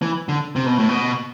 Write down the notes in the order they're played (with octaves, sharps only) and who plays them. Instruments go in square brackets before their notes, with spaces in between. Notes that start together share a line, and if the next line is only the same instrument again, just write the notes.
[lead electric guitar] E3
D3
C3
B2
A2
B2